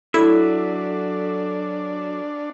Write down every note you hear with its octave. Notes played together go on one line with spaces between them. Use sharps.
F#3 D4 E4 A4 E5